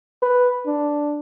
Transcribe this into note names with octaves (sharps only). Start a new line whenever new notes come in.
B4
D4